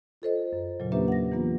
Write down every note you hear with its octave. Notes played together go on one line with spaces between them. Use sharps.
F4 A4 C5 D#5
F#2
E2 A#2 C#3 F#3
A#3 C#4 D4 G4 B4 E5
F#5 A#6
E3 A#3 B3 F4